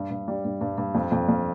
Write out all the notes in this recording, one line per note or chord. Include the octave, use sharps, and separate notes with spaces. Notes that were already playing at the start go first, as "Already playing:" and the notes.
Already playing: G2
G2
G3
G2
G2
G2
F2
F2
F2